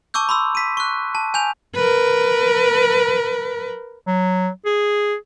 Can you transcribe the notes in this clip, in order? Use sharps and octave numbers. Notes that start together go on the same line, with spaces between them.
A5 C#6 D6 E6 G6
B5 C6 E6
B6 D#7
C#6 F#6
A5
G#5 G6 F7
A#4 B4
F#3
G#4